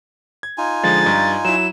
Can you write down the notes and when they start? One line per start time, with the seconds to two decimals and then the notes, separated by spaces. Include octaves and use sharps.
0.43 G#6
0.58 D#4 F4 G#5
0.83 D3 F3 G#3 A6
1.06 G2 A#5
1.45 F#3 E4 E7